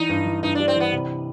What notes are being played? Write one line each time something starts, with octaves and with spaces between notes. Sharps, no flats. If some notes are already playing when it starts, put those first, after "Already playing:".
Already playing: E3 D#4
G2
E3
G2 D#4
G3 D4
C4
E3 B3
C3